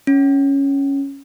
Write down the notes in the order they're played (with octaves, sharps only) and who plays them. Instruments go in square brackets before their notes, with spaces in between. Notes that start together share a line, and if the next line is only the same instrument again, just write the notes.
[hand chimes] C#4